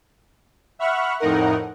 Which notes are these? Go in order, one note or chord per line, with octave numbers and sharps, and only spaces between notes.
E5 F#5 B5 C#6 F6 F#6
F2 A2 D#4 A#4 F#5